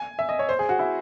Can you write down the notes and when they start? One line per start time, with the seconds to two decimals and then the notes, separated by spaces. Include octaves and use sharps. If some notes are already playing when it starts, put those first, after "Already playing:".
Already playing: G#5
0.19 E5
0.29 D#5
0.39 C#5
0.49 C5
0.59 G#4
0.69 F#4
0.79 E4